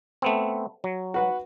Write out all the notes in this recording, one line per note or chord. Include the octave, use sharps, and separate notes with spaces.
A3 B3 C4
F#3
F#4 B4 F#5